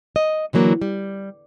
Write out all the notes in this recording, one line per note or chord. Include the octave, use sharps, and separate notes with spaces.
D#5
D3 E3 F#3 A#3 D4
G3